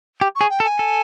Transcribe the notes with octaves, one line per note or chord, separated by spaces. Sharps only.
G4
G#4 C#6
G5
A4
G#5
A4